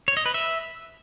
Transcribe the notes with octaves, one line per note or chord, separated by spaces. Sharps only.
C#5
D#5
B4
E5